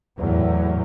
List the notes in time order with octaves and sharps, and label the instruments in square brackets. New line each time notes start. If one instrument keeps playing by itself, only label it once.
[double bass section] E2 A2 F#3